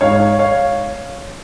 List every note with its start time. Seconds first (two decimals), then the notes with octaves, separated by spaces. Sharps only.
0.01 G#2 G#3 D#4 C#5 F5
0.20 C#5
0.39 C#5 F5